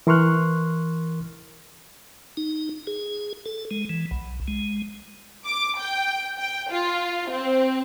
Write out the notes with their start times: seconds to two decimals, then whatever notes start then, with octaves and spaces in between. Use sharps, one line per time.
0.07 E3 A#4 C6 C#6 F6 F#6
2.37 D#4
2.87 G#4
3.46 A4
3.71 G#3
3.89 E3
4.11 B1
4.48 G#3
5.46 D6
5.78 G5
6.38 G5
6.70 F4
7.30 C4